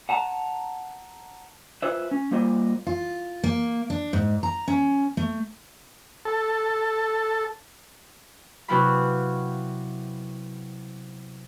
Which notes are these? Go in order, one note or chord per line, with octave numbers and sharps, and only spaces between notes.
F#5 A5 A#5
F4 B4 C5 E5
C#4
G3 A#3 F4 C5 D#5
F4
A#3
D4
G#2
A#5
C#4
A3
A4
C3 F#3 B3 E4 F5 B5